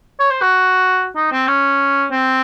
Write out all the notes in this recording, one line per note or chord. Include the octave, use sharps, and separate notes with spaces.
C#5
C5
F#4
D#4
C4
C#4
C4